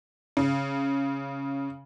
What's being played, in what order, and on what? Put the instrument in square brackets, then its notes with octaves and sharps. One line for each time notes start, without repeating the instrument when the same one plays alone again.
[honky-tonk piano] C#3